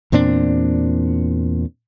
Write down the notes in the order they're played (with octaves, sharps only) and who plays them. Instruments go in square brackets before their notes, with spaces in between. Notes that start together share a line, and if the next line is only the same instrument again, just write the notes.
[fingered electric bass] E2 A#2 C4 D4